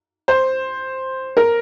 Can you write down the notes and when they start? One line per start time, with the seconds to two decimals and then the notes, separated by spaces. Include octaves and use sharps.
0.28 C5
1.37 A#4